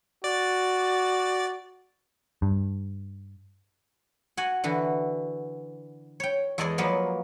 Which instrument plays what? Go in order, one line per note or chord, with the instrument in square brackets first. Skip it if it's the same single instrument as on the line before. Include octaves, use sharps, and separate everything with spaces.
[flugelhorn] F#4 [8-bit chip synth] D5 A6
[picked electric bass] G2
[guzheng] F#4 F#5 G#5
D3 E3 F#4
C#5 G5
E2 G#3 A4 D5 D#5 G#5
F3 F#3 A#3 B3